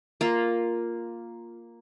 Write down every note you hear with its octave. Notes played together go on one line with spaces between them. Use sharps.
A#3 F4